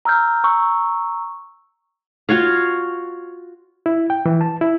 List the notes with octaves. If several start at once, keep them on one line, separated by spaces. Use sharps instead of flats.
A#5 E6 F6 G6
A#5 C#6 E6
F4 F#4 C#5 F5
E4
G5
E3
A5
E4